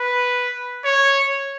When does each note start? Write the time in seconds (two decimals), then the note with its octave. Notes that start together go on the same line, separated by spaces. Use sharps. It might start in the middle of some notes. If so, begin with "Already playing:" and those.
Already playing: B4
0.85 C#5